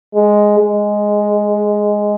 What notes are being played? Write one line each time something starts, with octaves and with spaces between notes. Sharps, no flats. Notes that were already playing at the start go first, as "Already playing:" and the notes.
G#3
G#3